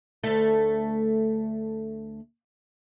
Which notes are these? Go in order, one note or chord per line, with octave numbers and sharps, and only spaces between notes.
D2 A3